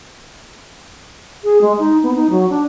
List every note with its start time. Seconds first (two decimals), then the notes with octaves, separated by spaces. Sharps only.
1.44 G#4
1.61 G#3
1.79 D#4
2.03 B3
2.15 D#4
2.30 F#3
2.50 D4